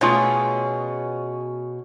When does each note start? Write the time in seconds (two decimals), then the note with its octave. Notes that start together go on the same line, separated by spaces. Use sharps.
0.01 B2 A3 C#4 F4 G#4 C#5